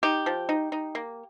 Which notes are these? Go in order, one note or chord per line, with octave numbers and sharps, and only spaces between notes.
D#4 G4
F3
D#4
D#4
A#3